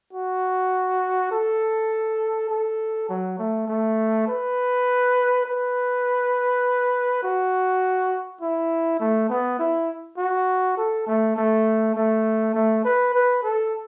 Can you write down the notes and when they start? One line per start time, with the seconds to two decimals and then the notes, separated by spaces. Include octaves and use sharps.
0.13 F#4
1.31 A4
2.49 A4
3.09 F#3
3.38 A3
3.68 A3
4.28 B4
5.46 B4
7.23 F#4
8.41 E4
9.00 A3
9.30 B3
9.59 E4
10.18 F#4
10.77 A4
11.07 A3
11.36 A3
11.96 A3
12.54 A3
12.84 B4
13.14 B4
13.43 A4